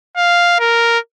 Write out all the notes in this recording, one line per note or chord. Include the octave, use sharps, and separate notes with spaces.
F5
A#4